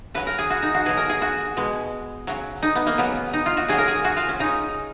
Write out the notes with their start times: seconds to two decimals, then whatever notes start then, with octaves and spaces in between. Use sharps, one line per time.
0.14 C#3 F#3 B4
0.27 A#4
0.39 G#4
0.50 F#4
0.63 D#4
0.74 F#4
0.85 B2 F#3 G#4
0.97 A#4
1.09 G#4
1.22 F#4
1.57 B2 G#3
2.27 C#3 F#3
2.63 D#4
2.75 B3
2.87 A#3
2.98 C#3 F#3 B3
3.33 D#4
3.46 F4
3.57 F#4
3.68 C#3 F#3 G#4
3.78 A#4
3.88 G#4
4.04 F#4
4.16 F4
4.28 C#4
4.40 C#3 G#3 D#4